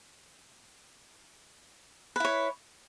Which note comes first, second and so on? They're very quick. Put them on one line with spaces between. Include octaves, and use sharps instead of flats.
B4 E4 C#5